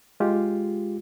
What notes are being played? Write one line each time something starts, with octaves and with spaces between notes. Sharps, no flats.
G#3 F4 G4